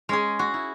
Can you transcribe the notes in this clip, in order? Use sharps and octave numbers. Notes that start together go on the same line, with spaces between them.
G#3 C#4 G#4
F#4
E4